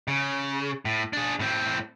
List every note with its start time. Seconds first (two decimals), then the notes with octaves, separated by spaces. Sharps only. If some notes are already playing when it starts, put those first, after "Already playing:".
0.08 C#3
0.85 A2
1.13 D4 G#4
1.40 A2 C4